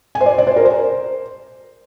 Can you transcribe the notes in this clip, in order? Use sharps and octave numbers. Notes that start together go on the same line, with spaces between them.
G#5
C5
D5
D5
C5
A#4
C5